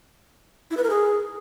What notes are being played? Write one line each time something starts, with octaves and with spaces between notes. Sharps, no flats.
E4
B4
A#4
G#4